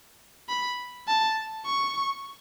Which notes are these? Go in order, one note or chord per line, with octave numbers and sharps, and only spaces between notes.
B5
A5
C#6